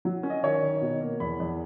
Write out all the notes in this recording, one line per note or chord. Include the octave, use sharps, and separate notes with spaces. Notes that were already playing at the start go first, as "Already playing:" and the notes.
F#3
C#4
D#5
D#3 C#5
D#3
B2
A#3
E2 B5
E2